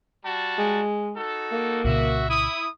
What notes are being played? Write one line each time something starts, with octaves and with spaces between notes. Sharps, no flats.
G3 F#4 A5
G#3
D#4 F#4 A4
A#3
C2 A#2 C#3 F#4 E5
E4 D#6